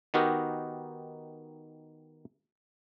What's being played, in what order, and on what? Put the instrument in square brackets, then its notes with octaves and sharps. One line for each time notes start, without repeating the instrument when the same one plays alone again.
[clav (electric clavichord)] D#3 B3 D#4 F#4 G4 A#4